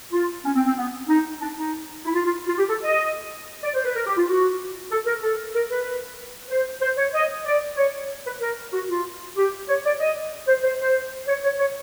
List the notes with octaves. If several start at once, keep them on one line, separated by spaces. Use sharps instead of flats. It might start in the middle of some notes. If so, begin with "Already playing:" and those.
F4
C#4
C4
C4
B3
D#4
D4
D#4
E4
F4
F4
F4
G4
A4
D#5
D5
C5
B4
A#4
G4
F4
F#4
A4
A#4
A4
A#4
B4
C5
C5
C#5
D#5
D5
C#5
B4
A#4
F#4
F4
G4
C#5
D5
D#5
C5
C5
C5
C#5
C#5
C#5